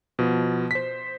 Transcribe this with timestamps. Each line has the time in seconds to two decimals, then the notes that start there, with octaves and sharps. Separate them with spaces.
0.19 B2 F3
0.71 C5 B6